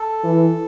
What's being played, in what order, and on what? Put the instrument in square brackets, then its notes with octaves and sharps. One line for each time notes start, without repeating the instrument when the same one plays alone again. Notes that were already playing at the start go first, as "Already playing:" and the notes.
Already playing: [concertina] A4
[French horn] E3